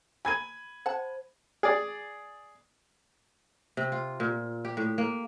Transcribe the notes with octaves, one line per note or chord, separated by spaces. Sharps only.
A#4 G#5 B5 G#6 D#7
C5 F#5 A5
G#4 D5
C3
F4
A#2
G4
A2
A#3